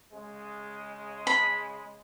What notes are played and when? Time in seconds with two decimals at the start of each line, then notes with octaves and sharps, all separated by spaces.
0.12 C#3 G#3
1.27 B5